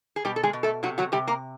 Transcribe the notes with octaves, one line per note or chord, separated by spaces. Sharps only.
G#4
B2 G3 G4
A4
G#3 G#4
B2
A3 A4
C3 F#3 F#4
F#3 F#4
C3 G3 G4
A#3 A#4